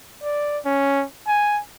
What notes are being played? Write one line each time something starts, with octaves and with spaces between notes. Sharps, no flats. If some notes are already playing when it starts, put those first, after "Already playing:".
D5
C#4
G#5